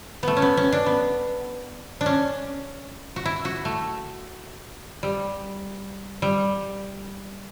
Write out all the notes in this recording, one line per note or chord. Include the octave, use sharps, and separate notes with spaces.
A3 B3
C#4
B3
C#4
D4
B3
D4
C#4
F#4
E4
F#4
A3
G3
G3